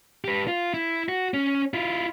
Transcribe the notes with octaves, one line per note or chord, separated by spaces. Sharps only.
G4 B4
F4
E4
F#4
C#4
E4 F4